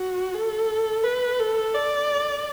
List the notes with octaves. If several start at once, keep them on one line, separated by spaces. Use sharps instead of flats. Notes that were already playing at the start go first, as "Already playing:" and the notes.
Already playing: F#4
A4
B4
A4
D5